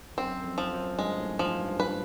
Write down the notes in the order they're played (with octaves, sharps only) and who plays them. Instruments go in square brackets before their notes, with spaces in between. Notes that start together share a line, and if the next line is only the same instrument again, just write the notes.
[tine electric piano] F#2 [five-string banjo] C4
[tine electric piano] F2
[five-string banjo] F3
[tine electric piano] F#2
[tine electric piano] G2 [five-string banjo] G#3
[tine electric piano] A2
[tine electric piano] G#2 [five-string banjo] F3
[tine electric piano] G2
[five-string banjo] B4